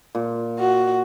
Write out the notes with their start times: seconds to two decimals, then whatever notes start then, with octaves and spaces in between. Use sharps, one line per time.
0.15 A#2
0.59 F#4